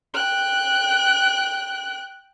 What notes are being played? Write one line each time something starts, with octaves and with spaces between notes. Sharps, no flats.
G5 F#6